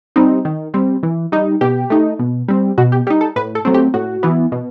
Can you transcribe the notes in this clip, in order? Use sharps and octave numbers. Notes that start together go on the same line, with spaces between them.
G3 C4 D#4
D#3
G3 C4
E3
G3 D#4
B2 G4
A3 D#4
B2
G3 C4
B2 F#4
G4
G3 D#4 G4
A4
A2 B4
A4
F#3 A3 C4
G4
A2 F#4
E3 B3
B2